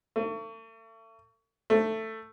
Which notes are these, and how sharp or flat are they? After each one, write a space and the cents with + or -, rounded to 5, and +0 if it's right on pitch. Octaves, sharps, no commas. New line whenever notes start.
A3 +40
A3 +10